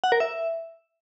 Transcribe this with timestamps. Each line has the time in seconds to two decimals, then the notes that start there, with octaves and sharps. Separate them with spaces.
0.04 F#5
0.12 A#4
0.20 E5